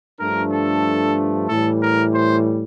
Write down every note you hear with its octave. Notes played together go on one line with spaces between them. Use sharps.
G2 F3 A3 D4 A#4
A4
A2 E3 G3 A4
A#4
C5